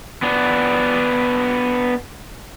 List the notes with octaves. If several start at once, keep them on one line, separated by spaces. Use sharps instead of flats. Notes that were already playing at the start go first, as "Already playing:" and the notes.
B3 D4